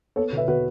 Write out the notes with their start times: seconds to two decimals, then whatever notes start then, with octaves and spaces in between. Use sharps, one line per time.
0.16 B3 A4 C#5
0.32 B2
0.37 B4 E5
0.48 B2 F#4 B4